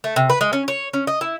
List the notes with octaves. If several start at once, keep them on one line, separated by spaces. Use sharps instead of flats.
A3
C3
B4
G#3
C#4
C#5
C#4
D#5
E4